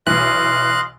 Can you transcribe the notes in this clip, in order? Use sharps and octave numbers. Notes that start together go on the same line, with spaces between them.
B1 E3 D#5 F5 C6 F#6